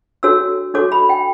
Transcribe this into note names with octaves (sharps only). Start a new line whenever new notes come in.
D4 F#4 A4 C#5 E6
D4 F#4 A4 C#5 D6
B5
G5